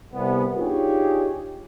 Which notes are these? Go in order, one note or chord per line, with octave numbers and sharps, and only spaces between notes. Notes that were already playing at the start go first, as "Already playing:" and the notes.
C2 B3
D4 D#4 F4 G4 G#4 C#5